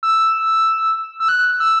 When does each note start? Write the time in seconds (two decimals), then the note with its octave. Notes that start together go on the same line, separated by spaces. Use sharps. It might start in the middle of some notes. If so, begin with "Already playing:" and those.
0.03 E6
1.20 E6
1.29 F#6
1.60 E6